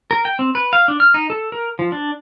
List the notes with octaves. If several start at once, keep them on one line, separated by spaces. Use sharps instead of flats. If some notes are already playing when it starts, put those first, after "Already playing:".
A#4
G5
C4
B4
F5
D4
F6
D#4
A4
A#4
F3
D4